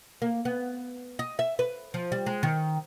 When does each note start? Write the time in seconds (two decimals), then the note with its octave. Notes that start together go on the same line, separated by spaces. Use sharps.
0.22 A#3
0.45 B3
1.19 D#5
1.39 E5
1.59 B4
1.94 F3
2.12 G3
2.26 G#3
2.43 D#3